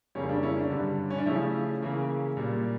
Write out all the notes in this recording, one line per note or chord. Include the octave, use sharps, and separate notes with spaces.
F2 C#3 G3 A#3 C#4
D4
C#4 E4
D4
G2 D3 G3
C#4
D4
C#3 F3 A3 C#4 E4
C#3 E3 A#3
A#2 G3 A#3